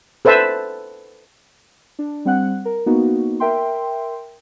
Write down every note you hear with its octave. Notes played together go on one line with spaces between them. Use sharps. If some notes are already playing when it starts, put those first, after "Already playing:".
A4 B4 C5 E5 A5
D4
G3 C4 F#5 F#6
A#4
A#3 B3 D#4 F#4
A#4 E5 G5 C6